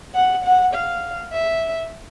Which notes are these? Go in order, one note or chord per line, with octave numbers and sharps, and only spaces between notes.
F#5
F#5
F5
E5